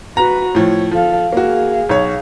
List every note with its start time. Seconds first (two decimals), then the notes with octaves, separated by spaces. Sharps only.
0.17 F#4 B4 A#5
0.55 A2 F3 C#5
0.91 F3 A4 F5
1.32 A#3 F#4 G#4 F5
1.89 B1 C#5